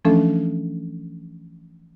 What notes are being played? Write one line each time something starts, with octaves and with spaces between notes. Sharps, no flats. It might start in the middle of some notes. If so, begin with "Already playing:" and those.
E3 F3 A3 C#4 D4 A4